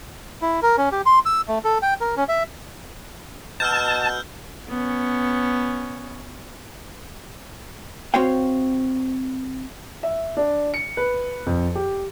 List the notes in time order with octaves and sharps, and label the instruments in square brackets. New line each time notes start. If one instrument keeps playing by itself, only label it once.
[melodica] E4
A#4
C#4
G4
C6
E6
A3
A4
G5
A#4
C#4
E5
[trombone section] B2 [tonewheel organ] A5 [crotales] E6 F6 G6
[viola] B3 C#4
[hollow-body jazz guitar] C4 F#4 C5 C#5 F5 G5
[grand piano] E5
D4
C#7
B4
F2
G4